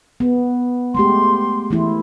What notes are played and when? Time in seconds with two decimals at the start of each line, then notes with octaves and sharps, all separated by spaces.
0.20 B3
0.95 G#3 A3 G4 C6
1.70 E3 A3 E4